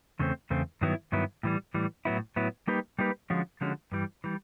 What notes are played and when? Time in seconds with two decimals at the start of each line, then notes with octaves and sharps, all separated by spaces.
0.19 E2 C#3 A3 C4
0.50 E2 C#3 A3 C4
0.81 G2 D#3 F#3 B3 E4
1.12 G2 D#3 F#3 B3 E4
1.43 A2 E3 G3
1.74 A2 E3 G3
2.05 A2 F#3 B3 E4
2.36 A2 F#3 B3 E4
2.67 G3 A#3 D#4 G4 B4
2.99 G3 A#3 D#4 G4 B4
3.30 D3 F3 G#3 C#4 F#4
3.61 D3 F3 G#3 C#4 F#4
3.92 G2 E3 G3
4.24 E3 G3